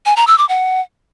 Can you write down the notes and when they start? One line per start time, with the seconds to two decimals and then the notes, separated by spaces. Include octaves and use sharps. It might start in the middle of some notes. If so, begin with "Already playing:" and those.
0.06 G#5
0.17 A#5
0.27 E6
0.38 D6
0.49 F#5